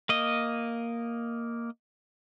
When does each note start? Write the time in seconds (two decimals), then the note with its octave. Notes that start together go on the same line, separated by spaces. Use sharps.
0.09 A#3 D#5